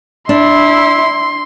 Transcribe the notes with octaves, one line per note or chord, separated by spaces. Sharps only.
D4 E4 C6